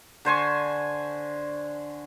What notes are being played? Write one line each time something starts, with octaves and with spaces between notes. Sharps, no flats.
D3 C5 G#5 C#6